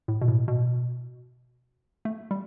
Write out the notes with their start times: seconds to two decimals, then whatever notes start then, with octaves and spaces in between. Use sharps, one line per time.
0.08 A2
0.22 B2
0.28 A2
0.48 B2
2.05 A3
2.31 G3